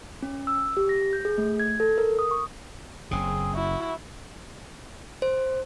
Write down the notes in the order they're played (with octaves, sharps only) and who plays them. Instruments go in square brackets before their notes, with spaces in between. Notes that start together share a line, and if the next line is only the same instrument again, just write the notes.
[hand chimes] C#4
E6
G4
A#6
G6
G#4
A3
G#6
A4
A#4
D#6
C#6
[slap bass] F#1 C#3 [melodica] C4 G#4
[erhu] E4 [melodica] F#4
[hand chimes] C5